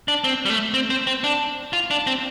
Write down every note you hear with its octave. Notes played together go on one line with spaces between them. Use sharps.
D4
C4
G3
A3
C4
C4
C4
D4
F4
D4
C4